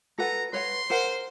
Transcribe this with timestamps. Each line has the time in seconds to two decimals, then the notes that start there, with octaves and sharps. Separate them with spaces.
0.18 A4 B4 F#5 A#5
0.53 B4 C#5 F#5 C6
0.90 A#4 C5 F#5